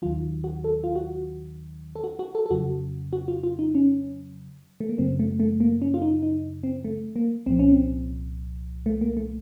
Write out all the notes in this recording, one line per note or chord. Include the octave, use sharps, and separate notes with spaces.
D#2 D#3 F#3 F4
F#4
A4
F4
F#4
A4
F#4
F#4
A4
A4
F2 C#3 F#3 F#4
F#4
F4
F4
D#4
C#4
A3
A#3
F#2 C#3 F#3 C4
A3
A3
A#3
C#4
F4
D#4
D#4
C4
A3
A#3
C2 A#2 F3 C4
C#4
C4
A3
A#3
A3